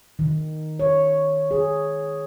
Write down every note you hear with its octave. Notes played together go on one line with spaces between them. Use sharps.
D#3
C#5
G#4